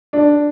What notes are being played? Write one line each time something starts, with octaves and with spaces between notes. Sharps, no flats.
D4